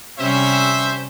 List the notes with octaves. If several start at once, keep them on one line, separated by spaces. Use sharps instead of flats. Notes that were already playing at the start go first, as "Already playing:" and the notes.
C3 G3 C#4 C5 E5